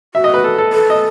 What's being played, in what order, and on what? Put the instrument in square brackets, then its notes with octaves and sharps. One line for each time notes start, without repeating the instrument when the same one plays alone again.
[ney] F#4 [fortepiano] E5
[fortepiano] D#5
B4
A4
A4
[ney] A4 [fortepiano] B4
[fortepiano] D#5